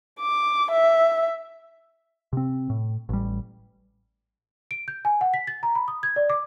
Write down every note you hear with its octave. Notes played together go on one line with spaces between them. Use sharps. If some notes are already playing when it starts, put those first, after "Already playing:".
D6
E5
C3 C4
A2
A1 G3
D7
G6
G#5
F#5
B6
A6
A#5
B5
D#6
G#6
D5
D6